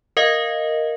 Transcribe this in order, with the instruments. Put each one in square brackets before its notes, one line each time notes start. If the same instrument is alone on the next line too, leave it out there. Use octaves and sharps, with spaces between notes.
[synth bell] A#4 D#5 F5